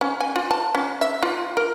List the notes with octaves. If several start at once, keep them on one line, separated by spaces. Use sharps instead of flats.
C#4
G#5
F4
A5
C#4
E5
F4
A#4